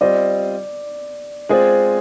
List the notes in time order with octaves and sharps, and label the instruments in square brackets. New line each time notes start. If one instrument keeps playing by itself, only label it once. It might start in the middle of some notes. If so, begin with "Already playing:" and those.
[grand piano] G3 C4 F4 C5 D#5 [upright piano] D5
[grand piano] G#3 C4 F4 G#4 D5 [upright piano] C5